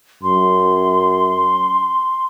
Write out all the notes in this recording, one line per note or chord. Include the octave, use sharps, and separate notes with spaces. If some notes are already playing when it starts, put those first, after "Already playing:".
F#2 C6